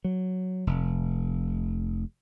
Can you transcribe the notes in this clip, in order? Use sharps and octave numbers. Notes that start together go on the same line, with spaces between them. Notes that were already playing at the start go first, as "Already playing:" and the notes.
F#3
F1